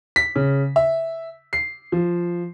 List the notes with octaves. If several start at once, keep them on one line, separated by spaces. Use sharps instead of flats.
B6
C#3
E5
C7
F3